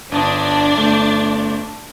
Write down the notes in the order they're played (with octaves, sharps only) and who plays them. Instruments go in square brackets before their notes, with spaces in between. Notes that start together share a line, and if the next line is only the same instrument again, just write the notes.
[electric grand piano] G1 A5 D#6 [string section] D4
[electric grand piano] G1 A3